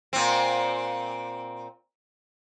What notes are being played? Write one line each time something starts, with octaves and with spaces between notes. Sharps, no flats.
A#2 C4